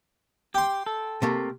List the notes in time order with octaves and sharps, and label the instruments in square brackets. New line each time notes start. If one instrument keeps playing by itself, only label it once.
[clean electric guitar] G4 [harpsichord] G5 C6
[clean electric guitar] A4
[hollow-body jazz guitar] C3 A3 A#3